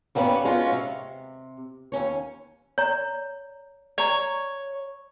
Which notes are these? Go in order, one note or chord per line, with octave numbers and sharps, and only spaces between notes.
G2 G3 A#3 B3 C#4
G#3 B3 C#4 F4 F#4
C3
D#2 C#4 C#5
C#5 D5 A#5
C#5 D5 A#5